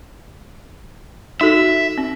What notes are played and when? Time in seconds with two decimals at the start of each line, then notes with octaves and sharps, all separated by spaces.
1.41 D#4 F#4 A4 E5
1.98 C4